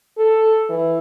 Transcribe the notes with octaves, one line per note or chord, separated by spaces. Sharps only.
A4
E3